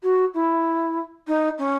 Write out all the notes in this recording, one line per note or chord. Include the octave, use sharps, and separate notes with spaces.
F#4
E4
D#4
C#4